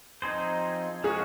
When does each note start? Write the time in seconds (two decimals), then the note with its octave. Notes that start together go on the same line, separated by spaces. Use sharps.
0.22 F3 C4 D#4 G#4 C5
1.04 F3 G#3 C#4 F#4 G#4